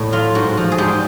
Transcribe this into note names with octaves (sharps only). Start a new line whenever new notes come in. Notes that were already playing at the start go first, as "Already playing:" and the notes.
Already playing: A2
F#3 F4
G#2 F#4
F3
G#4
G#2 G4